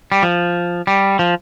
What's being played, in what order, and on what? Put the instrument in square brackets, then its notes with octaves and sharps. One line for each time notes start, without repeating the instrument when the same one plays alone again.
[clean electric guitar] G3
F3
G3
F3